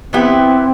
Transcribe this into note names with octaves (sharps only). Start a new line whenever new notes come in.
E3 B3 C4 E4 G4